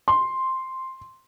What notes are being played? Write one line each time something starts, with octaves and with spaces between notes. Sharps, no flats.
C6